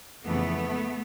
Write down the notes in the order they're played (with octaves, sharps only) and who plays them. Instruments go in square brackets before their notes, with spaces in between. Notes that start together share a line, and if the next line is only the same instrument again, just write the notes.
[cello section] F2 C#3 E3 A3 B3